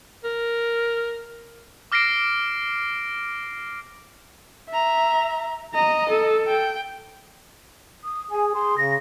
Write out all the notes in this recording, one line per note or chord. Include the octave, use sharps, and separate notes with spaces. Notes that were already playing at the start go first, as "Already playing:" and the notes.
A#4
D6 F6 A#6 C7 D7
E5 A#5
D#5 A#5
A4
G5
D#6
G#4 G#5
G#4 C6
C#3 A#6